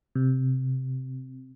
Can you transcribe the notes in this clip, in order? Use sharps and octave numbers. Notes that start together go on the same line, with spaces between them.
C3